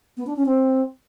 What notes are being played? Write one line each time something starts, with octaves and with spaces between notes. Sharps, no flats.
B3
D4
C#4
C4